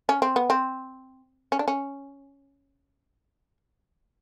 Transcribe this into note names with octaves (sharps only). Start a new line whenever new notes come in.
C#4
C4
B3
C4
C#4
D4
C#4